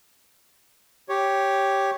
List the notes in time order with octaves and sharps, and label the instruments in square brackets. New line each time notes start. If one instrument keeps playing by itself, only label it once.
[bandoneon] G4 C#5